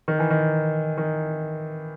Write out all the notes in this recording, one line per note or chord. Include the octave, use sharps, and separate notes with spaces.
D#3
E3
D#3
D#3